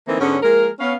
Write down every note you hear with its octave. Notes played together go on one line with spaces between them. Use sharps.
D3 E3 A3 A#3 C4 D#4
G#2 D3 B3 C#4
F3 G#3 A#3 A#4
B3 C#4 F5